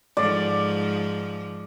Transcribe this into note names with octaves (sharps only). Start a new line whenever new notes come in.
G#2 F3 D5